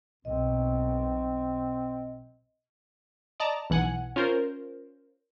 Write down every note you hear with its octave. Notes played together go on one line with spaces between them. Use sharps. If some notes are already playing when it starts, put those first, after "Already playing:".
B1 C4 D#5
D5 D#5 A5 A#5
B1 E3 F#5 G#5
C#4 F4 A#4 C5